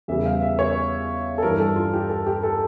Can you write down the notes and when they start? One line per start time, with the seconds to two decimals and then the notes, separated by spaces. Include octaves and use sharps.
0.08 E2 C#3 G3 E5
0.26 F5
0.42 E5
0.59 C#5
1.38 A4
1.43 G2 E3 G3 A#4
1.60 A4
1.76 F4
1.93 G4
2.09 A4
2.27 G4
2.43 A4